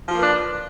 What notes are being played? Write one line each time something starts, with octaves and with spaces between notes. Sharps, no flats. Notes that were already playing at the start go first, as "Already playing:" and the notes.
F3 A#3 D4 F4 B4